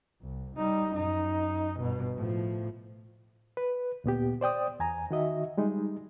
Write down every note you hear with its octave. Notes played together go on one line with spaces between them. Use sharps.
C2
G3 D#4
F#2 D#4
G1 B2
A2 F3
B4
D2 A#2 B3 G4
C5 D5 G5 D#6
E2 G#5 A#5
D#3 F#4 D#5 E5
G3 G#3 D#4